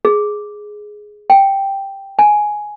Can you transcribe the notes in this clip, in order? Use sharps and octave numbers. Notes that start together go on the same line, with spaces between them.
G#4
G5
G#5